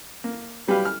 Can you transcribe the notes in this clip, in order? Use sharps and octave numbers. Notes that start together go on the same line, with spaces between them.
A#3
F#3 G3 G4 B4 F5
F6